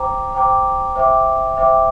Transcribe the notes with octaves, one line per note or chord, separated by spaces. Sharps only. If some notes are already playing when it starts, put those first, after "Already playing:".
Already playing: C5 G5 A#5 D6
C5 G5 A#5 D6
C5 E5 G5 D6
C5 E5 G5 D6